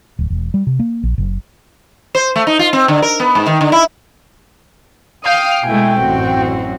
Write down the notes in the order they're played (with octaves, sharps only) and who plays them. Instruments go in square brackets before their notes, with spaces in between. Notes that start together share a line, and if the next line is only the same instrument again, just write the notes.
[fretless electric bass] D1
E1
G3
C3
A#3
A#1
F#1
[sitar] C5
A3
D#4
F4
C4
D3
A#4
B3
G#2
D#3
D3
E4
[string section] F5 [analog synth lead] G5 [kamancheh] D#6
[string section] B2 G#3 A3 [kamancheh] E4 G#5
[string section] A1 F#2 [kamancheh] C4 F#4